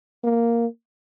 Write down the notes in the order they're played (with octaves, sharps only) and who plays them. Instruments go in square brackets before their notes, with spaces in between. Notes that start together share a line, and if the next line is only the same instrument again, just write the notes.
[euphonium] A#3